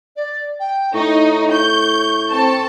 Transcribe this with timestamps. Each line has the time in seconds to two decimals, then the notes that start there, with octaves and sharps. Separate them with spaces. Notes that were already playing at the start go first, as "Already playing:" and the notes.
0.16 D5
0.60 G5
0.94 A2 D#4 C#6
1.53 G6
2.32 C4 A4 A5